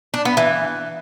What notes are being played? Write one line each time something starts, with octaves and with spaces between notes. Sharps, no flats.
D4
B3
E3